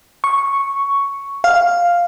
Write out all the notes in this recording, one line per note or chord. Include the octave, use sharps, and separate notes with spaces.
C#6
F5